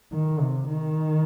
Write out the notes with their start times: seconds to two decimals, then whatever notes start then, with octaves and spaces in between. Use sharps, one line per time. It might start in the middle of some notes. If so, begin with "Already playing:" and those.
0.13 D#3
0.40 C3
0.68 D#3